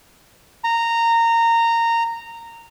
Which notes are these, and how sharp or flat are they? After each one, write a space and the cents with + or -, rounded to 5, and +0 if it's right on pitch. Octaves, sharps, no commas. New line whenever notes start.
A#5 -15